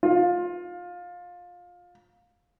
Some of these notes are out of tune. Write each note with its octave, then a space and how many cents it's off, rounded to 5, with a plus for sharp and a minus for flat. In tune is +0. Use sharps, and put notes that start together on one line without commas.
F4 +20